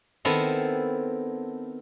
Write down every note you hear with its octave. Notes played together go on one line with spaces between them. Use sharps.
D#3 B3 C4 E4 A4 E5